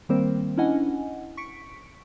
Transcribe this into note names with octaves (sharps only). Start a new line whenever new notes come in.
D#3 G3 A#3 C4 A#4 C5
C#4 D4 E4 D#5 F#5 G#5
C#6 B6 C#7 D7